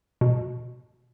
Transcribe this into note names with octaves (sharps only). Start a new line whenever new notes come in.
B2